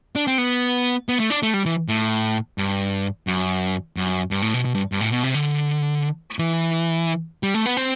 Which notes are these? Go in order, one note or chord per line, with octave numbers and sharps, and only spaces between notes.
D4
C4
B3
B3
A3
D4
A3
G3
E3
A2
G2
F#2
F#2
G2
A2
B2
B2
G2
G2
A2
B2
C3
D3
E3
G3
A3
B3
C4